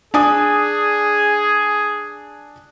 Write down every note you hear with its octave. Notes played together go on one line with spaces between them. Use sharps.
D4 G#4 G#5 D#6